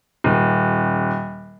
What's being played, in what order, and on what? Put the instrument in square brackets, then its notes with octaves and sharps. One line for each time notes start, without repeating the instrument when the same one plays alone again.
[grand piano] D#1